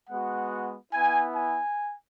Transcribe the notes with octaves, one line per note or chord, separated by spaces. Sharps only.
G#3 B3 F#4 F#5
B3 E4 G#5
G#5